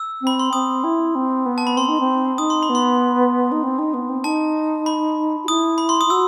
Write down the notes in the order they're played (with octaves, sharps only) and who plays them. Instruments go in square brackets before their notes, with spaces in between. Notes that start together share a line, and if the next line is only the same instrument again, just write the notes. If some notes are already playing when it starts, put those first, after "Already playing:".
Already playing: [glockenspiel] E6
[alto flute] C4
[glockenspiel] B5
C6
[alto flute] C4 [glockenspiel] D#6
[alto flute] E4
C4
B3
[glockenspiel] A5
B5
[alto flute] C4 [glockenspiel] C6
[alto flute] D#4
C4
[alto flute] D#4 [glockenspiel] D#6
[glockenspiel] C6
B5
[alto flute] B3
[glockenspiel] C6
[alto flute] D#4
C4
D#4
B3
C4
[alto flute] D#4 [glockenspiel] A5
[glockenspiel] B5
[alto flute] F#4
[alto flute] E4 [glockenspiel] D#6
[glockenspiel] B5
C6
D#6
[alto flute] E4
[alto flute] F#4 [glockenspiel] E6